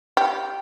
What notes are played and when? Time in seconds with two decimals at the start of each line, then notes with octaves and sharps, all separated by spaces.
0.17 G4